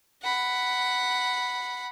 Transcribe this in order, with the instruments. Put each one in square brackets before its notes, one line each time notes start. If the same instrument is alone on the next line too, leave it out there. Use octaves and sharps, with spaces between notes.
[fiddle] F#5 B5